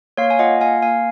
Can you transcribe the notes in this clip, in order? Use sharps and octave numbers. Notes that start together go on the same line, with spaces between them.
A#3 C#5 F5
G#5
F4 D#5 F#5
A#3 F5 G#5
A#3 F5 G#5